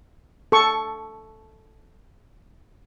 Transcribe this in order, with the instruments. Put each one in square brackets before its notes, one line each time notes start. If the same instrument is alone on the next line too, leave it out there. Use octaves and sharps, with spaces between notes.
[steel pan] A4 C#6